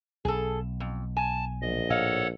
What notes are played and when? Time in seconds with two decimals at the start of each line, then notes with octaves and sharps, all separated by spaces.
0.25 B1 G#4 A4
0.80 F2
1.17 G#5 A5
1.61 A#1 D#5
1.90 A2 A4 C#5 D#5 F5 F#5